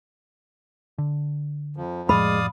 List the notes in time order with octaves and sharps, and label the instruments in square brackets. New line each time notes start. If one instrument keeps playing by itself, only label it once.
[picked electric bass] D3
[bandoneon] F2 F3
[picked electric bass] F2 A2 F3 [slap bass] G#3 [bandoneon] D5 F5 D#6 [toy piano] B5